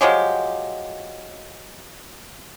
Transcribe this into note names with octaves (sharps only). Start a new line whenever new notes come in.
F3 F#3 G#3 G4